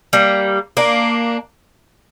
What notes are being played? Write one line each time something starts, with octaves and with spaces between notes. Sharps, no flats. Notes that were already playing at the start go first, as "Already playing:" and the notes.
G3 A#3
A#3 D4